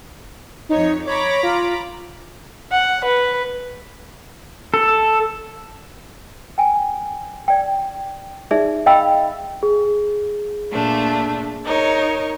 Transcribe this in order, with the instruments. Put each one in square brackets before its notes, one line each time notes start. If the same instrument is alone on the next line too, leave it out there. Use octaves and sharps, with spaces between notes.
[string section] F2 C#5 [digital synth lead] D#4
[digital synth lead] C#5 [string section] A#5 B5 D6
[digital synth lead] F4
[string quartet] F#5
B4
[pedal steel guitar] A4
[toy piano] G5 G#5
D5 G5
D#4 G#4 D5 E5
D#5 F5 G5 B5 E6
[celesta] G#4
[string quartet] A#2 A3 D4
D#4 A#4 C#5